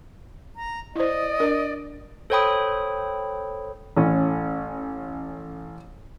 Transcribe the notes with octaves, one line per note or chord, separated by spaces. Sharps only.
A#5
E4 C5 D5 D#5
D4 A#4
A4 C5 C#5 G5 B5 D#6
A1 A2 C#4